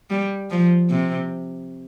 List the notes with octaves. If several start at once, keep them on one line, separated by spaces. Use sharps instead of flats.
G3
F3
C3